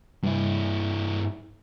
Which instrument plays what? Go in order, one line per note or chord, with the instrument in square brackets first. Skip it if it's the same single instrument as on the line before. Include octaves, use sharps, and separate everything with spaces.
[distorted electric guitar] G2 E4